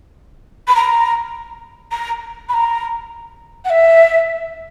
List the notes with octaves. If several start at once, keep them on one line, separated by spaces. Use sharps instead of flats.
B5
A#5
A#5
B5
A#5
F#5
E5